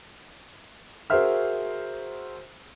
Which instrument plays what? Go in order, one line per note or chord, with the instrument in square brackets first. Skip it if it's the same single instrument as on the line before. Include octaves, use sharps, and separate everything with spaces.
[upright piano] F#4 G#4 A#4 C5 E5 F6